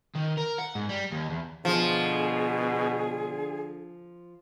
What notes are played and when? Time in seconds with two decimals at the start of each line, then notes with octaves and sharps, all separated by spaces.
0.16 D#3
0.38 A#4
0.59 F#5
0.75 G#2
0.89 G3
1.11 D#2
1.30 E2
1.65 B2 D3 F3 G#4